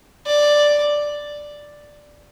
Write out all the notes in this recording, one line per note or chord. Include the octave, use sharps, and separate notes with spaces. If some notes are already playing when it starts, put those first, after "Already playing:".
D5